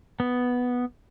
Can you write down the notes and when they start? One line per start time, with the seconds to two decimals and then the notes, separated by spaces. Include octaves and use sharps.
0.20 B3